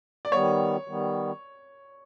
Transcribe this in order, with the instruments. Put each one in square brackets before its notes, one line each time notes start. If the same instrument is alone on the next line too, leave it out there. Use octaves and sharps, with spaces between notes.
[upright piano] D5
[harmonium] D#3 G3 B3 [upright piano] C#5
[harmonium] D#3 G3 B3